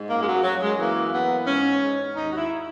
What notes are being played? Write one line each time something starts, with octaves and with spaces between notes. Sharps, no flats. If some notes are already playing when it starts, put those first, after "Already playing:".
Already playing: G#2
F#2 A#3
G#3
F#3
F#2 F#3
G#3
E3 A#3
E3 B3
G#2 C#4
G#2
D#2 D#4
F#4
E4